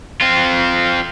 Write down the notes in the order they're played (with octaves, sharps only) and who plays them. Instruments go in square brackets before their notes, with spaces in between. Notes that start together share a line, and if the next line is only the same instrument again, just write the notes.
[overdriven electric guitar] C4 F4